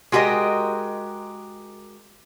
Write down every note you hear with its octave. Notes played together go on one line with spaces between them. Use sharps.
G#3 F#4 G4 A#4 D#5